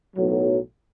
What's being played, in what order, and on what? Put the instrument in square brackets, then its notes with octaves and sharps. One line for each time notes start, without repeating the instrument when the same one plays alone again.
[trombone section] B1 A2 F#3